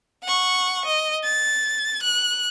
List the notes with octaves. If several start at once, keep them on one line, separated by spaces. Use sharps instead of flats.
F#5 C#6
D#5
A6
F#6